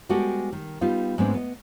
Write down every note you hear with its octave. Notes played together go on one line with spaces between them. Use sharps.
G3 G#3 B3 F#4 G4 A4
D#3
G3 B3 D#4 F4
G#2 G#3 A3 B3 C4 D4
B3 D#5